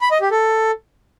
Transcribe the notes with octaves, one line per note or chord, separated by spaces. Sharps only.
B5
D#5
G4
A4